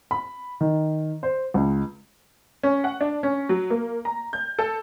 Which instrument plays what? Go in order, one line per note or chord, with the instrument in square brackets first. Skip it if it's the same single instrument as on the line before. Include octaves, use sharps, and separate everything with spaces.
[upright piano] B5
D#3
C5
C#2
[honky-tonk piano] C#4
F#5
D4
C#4
F#3
A#3
A#5
G6
A4